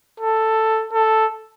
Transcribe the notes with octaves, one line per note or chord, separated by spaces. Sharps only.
A4
A4